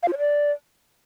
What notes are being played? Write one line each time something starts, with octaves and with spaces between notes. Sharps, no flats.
F5
F4
C#5
D5